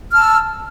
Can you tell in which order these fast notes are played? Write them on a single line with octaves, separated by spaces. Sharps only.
F6 A5 E6